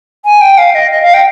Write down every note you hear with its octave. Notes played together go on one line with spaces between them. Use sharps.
G#5
G5
F5
D#5
D#5
F5
G5